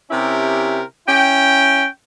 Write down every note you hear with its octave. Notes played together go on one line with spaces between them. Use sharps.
C3 C#4 E4 G4 A#4
C#4 E4 G5